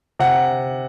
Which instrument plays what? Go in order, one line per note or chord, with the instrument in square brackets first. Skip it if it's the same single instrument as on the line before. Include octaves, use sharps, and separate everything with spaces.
[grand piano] C3 F#5